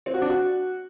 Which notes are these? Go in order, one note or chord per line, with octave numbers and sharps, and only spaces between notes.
C4
F#4
D4
F#4